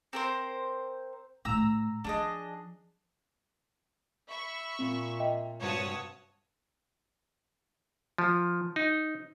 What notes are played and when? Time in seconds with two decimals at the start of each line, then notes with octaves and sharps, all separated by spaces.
0.13 C4 A#4 C5
1.45 A2 A3 A#5 E6
2.04 F3 D4 G#4 D#5
4.29 E5 B5 C#6
4.79 A#2 C4
5.20 D#5 E5 G5
5.60 G2 C3 F#4 C#5 A5 D#6
8.18 F3
8.76 D#4